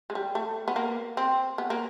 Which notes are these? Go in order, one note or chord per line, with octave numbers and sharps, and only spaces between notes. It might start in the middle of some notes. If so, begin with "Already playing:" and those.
G#3
G3
A3
B3
A#3
C4
B3
A#3